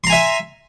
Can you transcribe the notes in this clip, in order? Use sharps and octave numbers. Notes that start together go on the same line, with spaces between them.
E5 G#5 A#5 C6